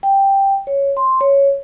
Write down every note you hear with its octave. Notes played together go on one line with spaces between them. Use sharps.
G5
C#5
C6
C#5